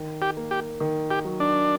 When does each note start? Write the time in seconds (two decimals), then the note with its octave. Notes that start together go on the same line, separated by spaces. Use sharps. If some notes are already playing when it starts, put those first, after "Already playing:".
Already playing: D#3
0.22 G4
0.37 A#3
0.51 G4
0.80 D#3
1.11 G4
1.25 F#3
1.40 D4